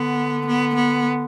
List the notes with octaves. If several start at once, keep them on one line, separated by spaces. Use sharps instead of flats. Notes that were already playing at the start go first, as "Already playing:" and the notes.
Already playing: D3 B3
B3
B3